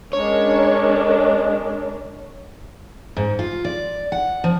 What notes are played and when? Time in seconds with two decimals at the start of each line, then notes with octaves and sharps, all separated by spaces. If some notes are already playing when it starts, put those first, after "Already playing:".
0.13 G#3 C#4 D4 A#4 C#5
3.16 G#2
3.39 F4
3.65 D5
4.12 F#5
4.44 F3